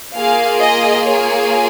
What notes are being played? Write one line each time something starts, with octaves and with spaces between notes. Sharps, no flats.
A#3 F4 G#4 F5
D#5
C#5